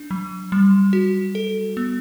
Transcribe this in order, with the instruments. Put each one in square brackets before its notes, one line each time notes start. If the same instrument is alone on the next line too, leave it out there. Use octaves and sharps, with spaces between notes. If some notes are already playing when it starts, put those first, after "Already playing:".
Already playing: [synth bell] D4
F#3
G3
F#4
A4
B3